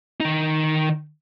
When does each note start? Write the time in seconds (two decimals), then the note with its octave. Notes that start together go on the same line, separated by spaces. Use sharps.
0.20 D#3 D#4